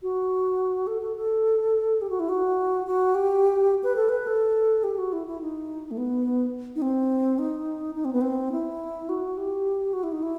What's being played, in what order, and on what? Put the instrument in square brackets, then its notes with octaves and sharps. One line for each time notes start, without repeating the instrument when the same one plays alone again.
[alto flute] F#4
A4
A4
A4
G4
F#4
E4
F#4
F#4
G4
B4
A4
B4
A4
G4
F#4
E4
E4
D#4
A3
B3
D#4
C4
D#4
D#4
C4
B3
C4
E4
F#4
G4
F#4
E4
D#4
E4